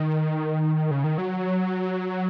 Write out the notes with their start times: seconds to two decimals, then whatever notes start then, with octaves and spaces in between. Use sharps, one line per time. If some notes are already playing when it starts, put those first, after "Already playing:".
Already playing: D#3
0.91 C#3
1.04 D#3
1.18 F#3